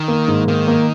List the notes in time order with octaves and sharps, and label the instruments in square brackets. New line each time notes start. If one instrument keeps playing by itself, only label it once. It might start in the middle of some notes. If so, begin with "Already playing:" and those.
Already playing: [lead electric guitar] D#3
[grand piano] A#3
G#2
[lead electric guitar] D#3 [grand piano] A#3
[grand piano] A#3